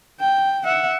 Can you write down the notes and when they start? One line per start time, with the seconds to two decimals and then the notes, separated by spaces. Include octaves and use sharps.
0.20 G5
0.65 E5 F#5